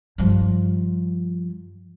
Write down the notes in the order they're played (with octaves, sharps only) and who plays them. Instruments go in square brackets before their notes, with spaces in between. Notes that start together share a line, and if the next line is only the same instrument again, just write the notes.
[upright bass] G2 F3